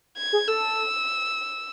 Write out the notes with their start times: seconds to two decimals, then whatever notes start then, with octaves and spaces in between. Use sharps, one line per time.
0.18 G#6
0.33 G#4
0.48 A4 E6